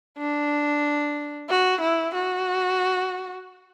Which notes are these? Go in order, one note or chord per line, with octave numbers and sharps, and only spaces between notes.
D4
F#4
E4
F#4